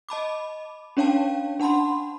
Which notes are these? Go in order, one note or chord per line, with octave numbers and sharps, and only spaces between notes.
D#5 A5 B5 D6
C#4 D4 C#5 F5 G5 A5
D4 F#5 A5 B5 C6